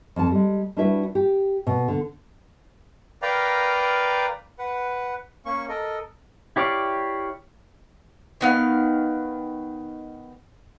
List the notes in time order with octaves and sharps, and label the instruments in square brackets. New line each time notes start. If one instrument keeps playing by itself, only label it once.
[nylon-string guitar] F2 A5
G3 G#3
G3 D4 E4 F#4 B4 E5
G4
B2
D3
[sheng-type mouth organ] A#4 B4 D5 F5 G5 A#5
B4 F#5
A#3 C#4 C#6
A4 A#4 D#5
[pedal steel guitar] E4 G4 C#5 D5 F5
[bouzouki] D#3 B3 F5